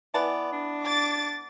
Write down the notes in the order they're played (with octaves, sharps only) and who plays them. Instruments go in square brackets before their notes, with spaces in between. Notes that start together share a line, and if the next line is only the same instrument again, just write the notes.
[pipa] E3 B3 A5 [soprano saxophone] D5
[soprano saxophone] D4
[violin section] D6 A6